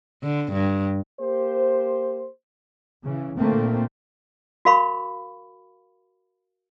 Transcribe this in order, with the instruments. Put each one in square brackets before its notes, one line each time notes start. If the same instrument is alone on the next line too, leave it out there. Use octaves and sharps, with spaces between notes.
[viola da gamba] D3
G2
[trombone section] A#3 G4 C5
[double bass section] C#3 E3
A#2 D3 A3 A#3 C4
[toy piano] F#4 A#4 F5 B5 C#6